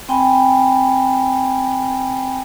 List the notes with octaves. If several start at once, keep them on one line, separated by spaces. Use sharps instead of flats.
C4 G5 G#5 B5